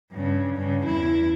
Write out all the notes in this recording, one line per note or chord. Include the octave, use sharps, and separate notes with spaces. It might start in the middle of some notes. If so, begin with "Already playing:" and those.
G2 C#3
G2 C#3
E2 E4